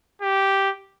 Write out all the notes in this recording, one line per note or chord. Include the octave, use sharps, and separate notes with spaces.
G4